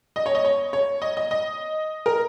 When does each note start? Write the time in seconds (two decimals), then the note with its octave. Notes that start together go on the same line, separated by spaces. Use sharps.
0.16 D#5
0.26 C#5
0.35 D#5
0.45 C#5
0.73 C#5
1.02 D#5
1.17 D#5
1.31 D#5
2.06 A#4